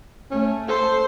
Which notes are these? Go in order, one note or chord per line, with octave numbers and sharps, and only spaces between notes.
A3 C#4
A4 C5